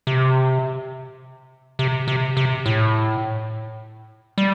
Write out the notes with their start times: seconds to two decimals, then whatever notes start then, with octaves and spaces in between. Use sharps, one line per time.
0.07 C3
1.79 C3
2.08 C3
2.37 C3
2.66 A2
4.38 G3